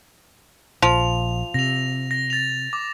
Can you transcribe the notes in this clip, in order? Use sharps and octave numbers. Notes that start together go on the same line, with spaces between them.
A#1 F3 F7
C3 A#6 F7
A#6
A6 F7
D6